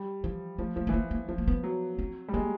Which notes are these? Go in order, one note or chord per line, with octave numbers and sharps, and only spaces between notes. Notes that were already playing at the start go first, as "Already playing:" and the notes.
Already playing: G3
E3 F3
F3 A3
F3 A3
E3 B3
F3 A#3
A#3
F3 B3
A#3
B3
F#3
C4
G3
G#3 A#3